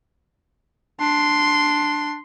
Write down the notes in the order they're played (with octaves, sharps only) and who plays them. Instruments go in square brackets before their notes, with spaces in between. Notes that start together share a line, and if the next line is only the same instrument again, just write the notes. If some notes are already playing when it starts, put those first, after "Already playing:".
[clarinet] D4 [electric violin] C6